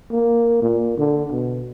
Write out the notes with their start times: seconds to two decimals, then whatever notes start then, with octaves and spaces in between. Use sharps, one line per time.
0.11 A#3
0.62 A#2
0.98 D3
1.32 B2